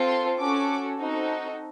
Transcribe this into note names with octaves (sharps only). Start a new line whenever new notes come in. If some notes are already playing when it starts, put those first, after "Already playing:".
Already playing: C4 F4 A4
C6
C#4 F#4 A4 D6
C4 D#4 F#4 A4